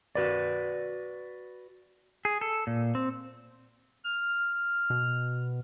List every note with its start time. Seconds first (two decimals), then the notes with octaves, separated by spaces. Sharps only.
0.15 F#4 B4 D5
2.25 G#4
2.41 A4
2.67 A#2
2.95 C4
4.05 F6
4.90 B2